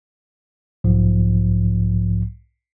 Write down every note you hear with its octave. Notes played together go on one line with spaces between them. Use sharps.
B1 G#2 F3